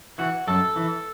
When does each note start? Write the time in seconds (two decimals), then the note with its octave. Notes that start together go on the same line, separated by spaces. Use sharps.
0.18 E3 F#4
0.47 F#2 A4
0.76 E3